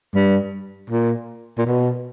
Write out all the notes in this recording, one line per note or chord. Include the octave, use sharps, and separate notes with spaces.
G2
A#2
A#2
B2